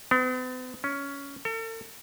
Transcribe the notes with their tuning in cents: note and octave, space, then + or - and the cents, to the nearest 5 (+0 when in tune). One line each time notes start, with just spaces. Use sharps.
B3 +45
C#4 +15
A4 +45